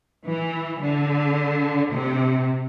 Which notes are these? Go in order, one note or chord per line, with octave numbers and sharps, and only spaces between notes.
E3
D3
C3